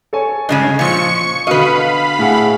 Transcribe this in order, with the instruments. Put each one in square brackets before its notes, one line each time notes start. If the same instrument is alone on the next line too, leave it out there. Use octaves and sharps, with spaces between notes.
[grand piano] A4 C#5 G#5
[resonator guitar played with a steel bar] G2 C#3 G#3 [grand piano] D#5 G#5
[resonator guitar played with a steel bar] A#2 F3 [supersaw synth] C#6 C#7
[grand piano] B2 D3 [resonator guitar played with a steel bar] B4 D#5 [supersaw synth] F5 B5
[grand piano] A2 G#4 F#5